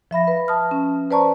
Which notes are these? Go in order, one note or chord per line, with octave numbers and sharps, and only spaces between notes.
F3 E5 B5 A#6
B4
A5 D#6 F6
C#4
B4 C5 D5 A5 A#5 C#6